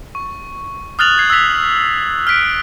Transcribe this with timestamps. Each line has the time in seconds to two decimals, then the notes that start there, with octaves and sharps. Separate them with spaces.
0.15 C#6
0.99 D#6 F6 F#6 A6 F7 F#7
1.18 G#6 C7
1.30 E6 A6 B6 F7
2.27 F6 F#6 B6 D7